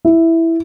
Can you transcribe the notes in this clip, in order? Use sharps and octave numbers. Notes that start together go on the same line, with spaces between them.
E4